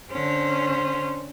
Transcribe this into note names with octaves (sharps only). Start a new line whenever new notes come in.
D3 C#4 C5